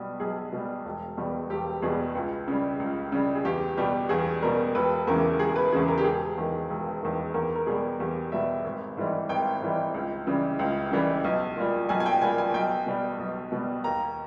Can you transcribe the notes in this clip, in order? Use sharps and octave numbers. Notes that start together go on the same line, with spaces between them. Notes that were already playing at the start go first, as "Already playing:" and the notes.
Already playing: B1 B2 G3
B1 G#4
B2 G3
E1
E2 B2 G3
E1 G4
E2 B2 G3 G#4
C#2
C#3 G3
C#2
C#3 G3
G#4
E2 G4
B2 G3 G4
E2 G#4
B2 G3 A#4
E1 B4
E2 C#3 E3 A#4
E1 G#4
B4
E2 C#3 E3 G#4
A#4
G4
E1 G#4
E2 D#3
E1
E2 D#3
E2 A#4
A#4
B2 G3 G#4
E2 G4
B2 G3 E5
G#1
G#2 E3 G3
G#1 G5
G#2 E3 G3
C#2
C#3 E3 G3
C#2
C#3 E3 G3
B1
A#2 G3
B1 G#5
G#5
G5
A#2 G3 G#5
G#5
B1 G5
B2 G3
B1
B2 G3
D#2 A#5